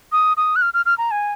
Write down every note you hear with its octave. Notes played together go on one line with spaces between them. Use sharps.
D#6
D#6
F#6
F6
F6
F6
A#5
G#5